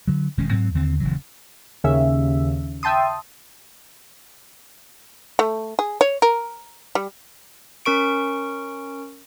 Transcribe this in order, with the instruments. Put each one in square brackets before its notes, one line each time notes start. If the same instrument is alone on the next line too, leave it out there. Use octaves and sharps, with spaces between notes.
[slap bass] D3 F#3
E1 D#3 G#3 C#4
G#2 F#3 C4
D#2 D3 C4
D#1 C#3 E3 F#3
[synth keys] D#2 C#3 E5
E5 G5 A5 C6 D#6
[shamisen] A3
G#4
C#5
A#4
G3
[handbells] C#4 A#4 C#6 D7